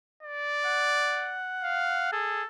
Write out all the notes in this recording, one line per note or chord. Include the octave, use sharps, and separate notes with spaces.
D5
F#5
F5
G#4 A4